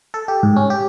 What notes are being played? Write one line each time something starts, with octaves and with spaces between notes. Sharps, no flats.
A4
G4
G#2
C#4
G4